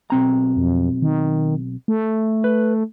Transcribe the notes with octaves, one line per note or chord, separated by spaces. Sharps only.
B1 C4 A#5
F2
D#3
A3
B4